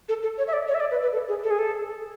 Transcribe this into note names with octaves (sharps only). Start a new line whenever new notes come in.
A4
A4
C#5
E5
D5
C#5
E5
D5
B4
B4
A4
G#4
A4
G#4
A4